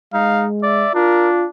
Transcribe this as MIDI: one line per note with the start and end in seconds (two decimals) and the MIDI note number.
0.14 0.86 56
0.14 0.46 63
0.14 0.46 77
0.63 0.93 74
0.63 0.94 76
0.95 1.49 62
0.95 1.46 65
0.95 1.29 70